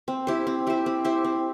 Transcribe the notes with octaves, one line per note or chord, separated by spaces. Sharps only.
C4
E4 G4 C5
C4
E4 G4 C5
C4
E4 G4 C5
C4